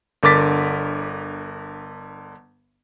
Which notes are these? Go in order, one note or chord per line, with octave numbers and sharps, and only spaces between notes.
G1 D3 A#4 D6 A6 B6